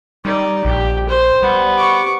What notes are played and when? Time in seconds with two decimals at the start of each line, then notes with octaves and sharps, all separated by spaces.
0.25 G3 D#4 D5
0.65 A#1 G4
1.09 C5
1.43 G3 B3
1.78 C#6 D6